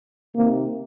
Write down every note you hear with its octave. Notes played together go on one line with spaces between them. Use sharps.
C3 D#3 A#3